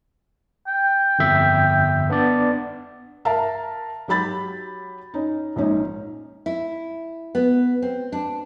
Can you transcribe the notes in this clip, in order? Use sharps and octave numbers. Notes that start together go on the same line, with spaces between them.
G5
G1 F2 E5
B3 D4 D5
A#4 E5 F5 A5 A#5
F#3 G4 B5 A6
C#4 D#4
A#1 G#2 C#4 D#4
E4
B3
C4
D4